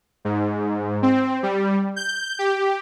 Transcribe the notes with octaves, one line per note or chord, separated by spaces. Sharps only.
G#2
C4
G3
G6
G4